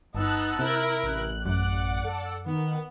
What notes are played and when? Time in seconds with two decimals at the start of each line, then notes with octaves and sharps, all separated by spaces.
0.15 G1 B3 D#4 A5 E6 F#6
0.59 C3 E4 A#4
1.03 A1 F#6
1.46 F#2 D5 F#5
2.04 A4
2.46 D#3 B3